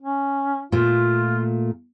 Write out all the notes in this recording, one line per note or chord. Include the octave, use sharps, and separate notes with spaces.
C#4
A#2 A3 F4